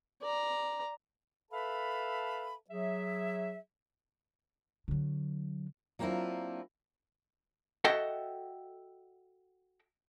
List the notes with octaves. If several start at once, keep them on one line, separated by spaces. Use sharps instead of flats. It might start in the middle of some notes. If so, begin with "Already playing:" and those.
D5 A#5
A4 B4 E5 F5 A5 B5
F#3 G#4 E5
D3 F#3
F#3 A#3 C4 D4 E4 F4
F#4 A4 D#5 E5 F#5 G5